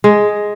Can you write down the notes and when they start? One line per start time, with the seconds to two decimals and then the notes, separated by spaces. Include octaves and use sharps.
0.04 G#3